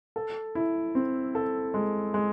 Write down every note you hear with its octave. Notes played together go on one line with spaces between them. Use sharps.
A4
E4
C4
A4
G#3
G#3